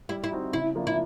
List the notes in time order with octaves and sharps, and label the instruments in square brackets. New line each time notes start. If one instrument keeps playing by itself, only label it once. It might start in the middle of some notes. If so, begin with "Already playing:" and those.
[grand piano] G3 [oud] E4
[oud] E4
[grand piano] C4 D#4 F#4
[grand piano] C#3 [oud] E4
[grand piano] F3 A#3 D4 F4
[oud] E4